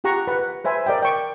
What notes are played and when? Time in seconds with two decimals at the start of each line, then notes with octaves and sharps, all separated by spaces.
0.04 F4 G4 F#5 A#5 C#6
0.27 B4 F#5
0.64 B4 C5 E5 G#5 B5
0.86 A#4 D5 D#5 G5
1.03 G5 C#6